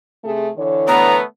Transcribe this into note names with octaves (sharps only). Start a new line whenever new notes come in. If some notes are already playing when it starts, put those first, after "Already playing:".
C3 A3 G#4
D3 E3 C#5
A3 B3 A#5